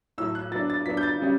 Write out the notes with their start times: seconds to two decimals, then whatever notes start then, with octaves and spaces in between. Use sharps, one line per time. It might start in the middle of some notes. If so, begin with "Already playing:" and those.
0.18 A2 F#3 A3 E6
0.35 F#6
0.52 F#3 B3 D4 A6
0.70 A6
0.86 F#3 B3 D4 B6
0.97 G6
1.03 A6
1.20 C#3 G3 C#4